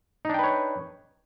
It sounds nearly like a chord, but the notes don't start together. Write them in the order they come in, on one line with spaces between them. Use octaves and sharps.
D#4 D4 G5 B4 C#5